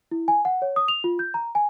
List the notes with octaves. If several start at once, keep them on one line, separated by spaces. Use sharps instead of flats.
E4
G#5
F#5
C#5
D#6
F7
F4
G6
A#5
G#5